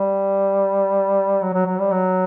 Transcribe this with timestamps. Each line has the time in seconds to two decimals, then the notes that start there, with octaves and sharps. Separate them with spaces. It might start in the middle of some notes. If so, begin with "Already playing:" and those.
Already playing: G3
1.41 F#3
1.54 F#3
1.66 F#3
1.79 G3
1.91 F#3